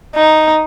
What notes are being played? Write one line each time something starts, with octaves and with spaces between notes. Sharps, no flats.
D#4